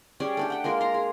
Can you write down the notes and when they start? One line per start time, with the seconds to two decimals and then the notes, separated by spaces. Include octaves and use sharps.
0.20 G3 C#4 G#4 D5
0.37 A3 D4 G4
0.50 F#5 G5
0.64 G#3 A#3 F4 A#4
0.81 A#5 C6
0.94 G#4